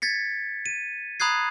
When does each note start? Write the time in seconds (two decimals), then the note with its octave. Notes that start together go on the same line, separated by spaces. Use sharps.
0.02 G#6 A6 B6 C#7
0.66 D#7
1.20 A#5 B5 D#6 F#6 G#6 C7